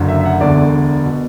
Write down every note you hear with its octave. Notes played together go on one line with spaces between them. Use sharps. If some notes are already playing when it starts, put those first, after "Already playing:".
Already playing: F#1 F#2 D3
E5
E5
F#5
E1 D2 D3 D5
B2